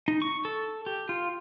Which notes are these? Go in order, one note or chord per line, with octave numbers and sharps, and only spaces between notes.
D#4
C#6
A4
G4
F4